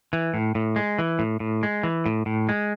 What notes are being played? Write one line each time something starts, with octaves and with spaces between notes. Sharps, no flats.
E3
A2
A2
G#3
E3
A2
A2
G#3
E3
A2
A2
G#3